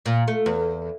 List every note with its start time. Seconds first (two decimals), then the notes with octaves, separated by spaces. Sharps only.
0.06 A#2
0.28 A3
0.46 E2